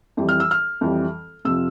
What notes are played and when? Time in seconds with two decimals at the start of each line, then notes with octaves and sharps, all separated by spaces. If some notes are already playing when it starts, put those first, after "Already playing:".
0.17 F2 E3 G3
0.29 F6
0.40 E6
0.51 F6
0.81 F2 E3 G3
1.45 F2 C3 F3 E6